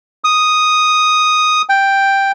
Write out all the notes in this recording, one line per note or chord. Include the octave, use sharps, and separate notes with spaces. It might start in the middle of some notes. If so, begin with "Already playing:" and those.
D#6
G5